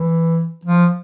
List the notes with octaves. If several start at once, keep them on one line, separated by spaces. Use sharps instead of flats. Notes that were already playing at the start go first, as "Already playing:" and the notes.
Already playing: E3
F3